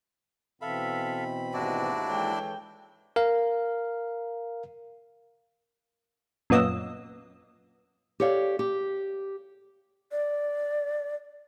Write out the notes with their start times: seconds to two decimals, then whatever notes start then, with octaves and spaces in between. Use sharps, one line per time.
0.61 B2 E3 C4 A4 E5 F5 B5
1.54 D#2 G#2 D4 E4 F#4 D5 D#5
2.08 E3 G#3 A4 C#5 G5
3.16 A#4 F5
6.50 F#2 A#2 B3 D#5 E6
8.20 G4 A4 C#5 D5 F5
8.59 G4
10.11 D5